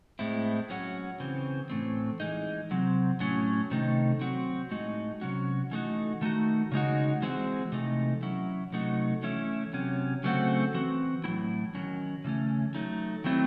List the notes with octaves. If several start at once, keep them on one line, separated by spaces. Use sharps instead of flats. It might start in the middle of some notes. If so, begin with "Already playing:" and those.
A2 G#3 C4 E4
F#3 C#4 F#4
C#3 E3 C4
A2 E3 A3 C4
E3 G#3 D#4
C3 F#3 C4
A2 F#3 C#4
C3 D#3 A3 D#4
F#3 C4 F#4
A2 G#3 D#4 F#4
C3 F#3 C#4 F#4
E3 A3 D#4 F#4
D#3 A3 D#4 F#4
C#3 G#3 D#4 F#4
E3 G#3 C4 F#4
C3 E3 A3 D#4
F#3 C#4 E4
C3 F#3 A3 D#4 F#4
E3 A3 C#4 E4
C3 F#3 C#4
C#3 F#3 A3 C4 F#4
E3 C4 F#4
A2 F#3 C4 E4
D#3 F#3 C#4
C#3 E3 A3 C#4
F#3 A3 D#4
D#3 F#3 A3 C4 E4